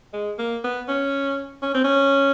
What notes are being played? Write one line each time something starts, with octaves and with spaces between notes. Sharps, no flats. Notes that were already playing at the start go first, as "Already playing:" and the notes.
G#3
A#3
B3
C#4
C#4
C4
C#4